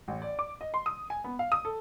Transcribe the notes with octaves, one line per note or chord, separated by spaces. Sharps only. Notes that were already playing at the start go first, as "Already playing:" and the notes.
A1
D5
D6
D#5
C6
D#6
G#5
B3
F5
D#6
A4